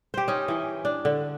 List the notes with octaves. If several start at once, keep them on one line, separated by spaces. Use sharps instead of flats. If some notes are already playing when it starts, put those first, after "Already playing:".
G4 C5
C#4 D#4
E3 D#5
D4
D3